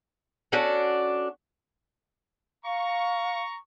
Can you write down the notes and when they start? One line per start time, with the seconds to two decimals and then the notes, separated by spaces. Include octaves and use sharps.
0.52 C#4 D4 F#4 A4
2.65 F5 A#5 C#6